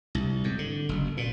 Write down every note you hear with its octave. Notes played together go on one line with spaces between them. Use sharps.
C2
G#2
D3
F#1
A#2